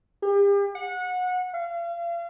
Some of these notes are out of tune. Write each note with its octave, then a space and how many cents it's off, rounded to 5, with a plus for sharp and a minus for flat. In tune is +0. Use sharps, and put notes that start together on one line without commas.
G4 +40
F#5 -25
F5 -35